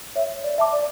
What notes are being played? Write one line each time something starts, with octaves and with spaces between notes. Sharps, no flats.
C#5 E5
D5
E5 A5 D6
D5